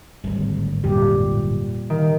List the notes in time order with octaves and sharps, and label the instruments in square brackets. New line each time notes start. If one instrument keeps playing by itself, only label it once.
[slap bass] D1 G#1 [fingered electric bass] G3
[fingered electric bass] F2 [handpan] A#2 G3 G4
[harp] D#3